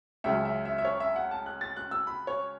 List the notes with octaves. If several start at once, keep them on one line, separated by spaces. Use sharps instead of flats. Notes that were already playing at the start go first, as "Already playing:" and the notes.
C#2 C#3 F#3 E5
E5
E5
E5
C#5
E5
F#5
A5
F#6
A6
F#6
E6
B5
C#5